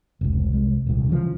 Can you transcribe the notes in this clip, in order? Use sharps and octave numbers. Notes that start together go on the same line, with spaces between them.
F1 C#2
C2 G#3
D#1 C2
C#3 E3 F3